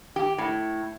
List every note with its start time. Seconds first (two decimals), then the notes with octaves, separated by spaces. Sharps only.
0.16 G4
0.38 A2